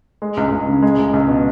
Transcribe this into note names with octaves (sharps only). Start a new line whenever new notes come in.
G#3
C#2
C#2
C#3
G#3
C#2
C#2
B2